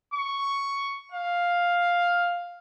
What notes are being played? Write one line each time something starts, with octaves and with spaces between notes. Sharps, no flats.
C#6
F5